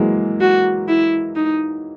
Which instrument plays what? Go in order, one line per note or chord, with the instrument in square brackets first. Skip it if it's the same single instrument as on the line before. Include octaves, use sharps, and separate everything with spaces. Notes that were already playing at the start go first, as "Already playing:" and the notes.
Already playing: [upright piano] E3 F#3 G#3 A#3
[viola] F#4
E4
D#4